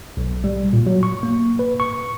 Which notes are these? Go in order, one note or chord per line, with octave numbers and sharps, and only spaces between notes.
B1
G3
A#2
F#3
C#6
A#3
B4
C#6